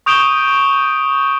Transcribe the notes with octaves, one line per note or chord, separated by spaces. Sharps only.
C#6 D#6 G6 D7 E7 G7